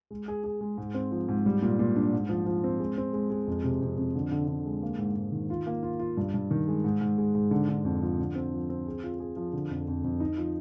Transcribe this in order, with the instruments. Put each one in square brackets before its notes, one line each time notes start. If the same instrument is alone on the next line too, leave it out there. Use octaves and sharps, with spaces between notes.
[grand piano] G#3
G#4
G#4
G#3
G#2
C4
F3
G#2
G3
A#2
A#2
D4
G#2
F3
F3
C4
G#3
C4
G#3
G#3
F2
C3
F2
F2
D3
D3
D3
G#3
A#3
G#2
G#2
D#3
F4
A#3
F4
F4
G2
G2
D#3
G#3
G#2
G#2
G#3
G#2
D3
D3
F2
F3
D3
C4
F3
C4
G#4
F4
G#4
F3
D3
F2
F2
F2
D#4
F3